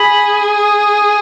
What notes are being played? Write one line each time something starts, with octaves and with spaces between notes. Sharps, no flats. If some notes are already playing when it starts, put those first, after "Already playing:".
Already playing: G#4 B5
D#6